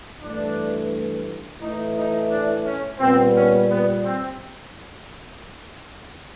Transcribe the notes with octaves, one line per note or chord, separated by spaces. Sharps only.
G2 E3 A3 D4
A2 E3 A3 D#4
D#4
D4
C#4
A#2 G3 B3 C4
C#4
B3
C4